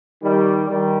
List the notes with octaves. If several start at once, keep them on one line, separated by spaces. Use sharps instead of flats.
D#3 G3
D#3 G3